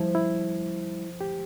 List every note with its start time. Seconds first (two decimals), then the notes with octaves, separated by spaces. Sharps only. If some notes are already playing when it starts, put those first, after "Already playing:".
Already playing: F3 G3 E4
0.15 E4
1.21 G4